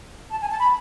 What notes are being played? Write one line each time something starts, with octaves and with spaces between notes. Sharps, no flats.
A5
G#5
A5
B5